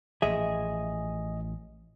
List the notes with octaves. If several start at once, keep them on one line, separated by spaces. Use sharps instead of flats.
A1 F3 G#4 D#5 E5